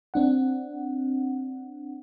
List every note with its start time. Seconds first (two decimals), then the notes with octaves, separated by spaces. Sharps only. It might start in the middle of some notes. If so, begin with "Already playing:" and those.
0.14 C4 D4 F#5